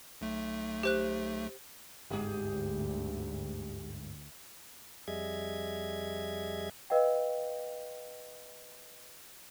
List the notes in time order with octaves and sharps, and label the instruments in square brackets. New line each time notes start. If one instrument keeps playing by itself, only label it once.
[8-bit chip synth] B1 A3
[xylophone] G4 C5 F#6
[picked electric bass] G1 G#2 [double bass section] D2 [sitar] G4 G#4
[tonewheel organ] F2 G3 G#4 D#5 E5 G#6
[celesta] B4 D#5 F5 G5